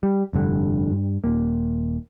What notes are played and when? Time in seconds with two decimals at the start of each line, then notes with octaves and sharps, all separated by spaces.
0.03 G3
0.33 F1 G2 D3
0.92 G2
1.24 D#1 A#3